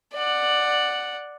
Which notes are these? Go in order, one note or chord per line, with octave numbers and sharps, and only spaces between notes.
D5 F#5